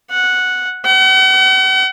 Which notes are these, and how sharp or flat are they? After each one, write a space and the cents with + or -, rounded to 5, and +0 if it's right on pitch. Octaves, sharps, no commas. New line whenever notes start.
F#5 -5
F#5 +40